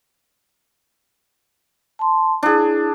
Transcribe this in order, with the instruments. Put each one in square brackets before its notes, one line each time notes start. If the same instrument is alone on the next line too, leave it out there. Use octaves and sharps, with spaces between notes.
[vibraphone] A5 C6
[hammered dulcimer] D4 G#4 [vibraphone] E4